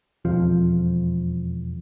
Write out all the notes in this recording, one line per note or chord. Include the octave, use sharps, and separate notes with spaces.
E1 F2 F3